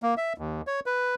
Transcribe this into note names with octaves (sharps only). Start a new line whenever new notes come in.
A#3
E5
D#2
C#5
B4